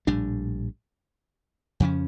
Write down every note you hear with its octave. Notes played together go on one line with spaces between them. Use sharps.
A#1 A2 G3 D4
F2 C#3 F3 C#4